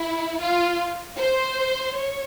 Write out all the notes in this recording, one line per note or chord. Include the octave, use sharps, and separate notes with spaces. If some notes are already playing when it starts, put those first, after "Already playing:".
Already playing: E4
F4
C5
C#5